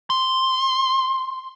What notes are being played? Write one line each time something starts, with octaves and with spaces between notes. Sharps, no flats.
C6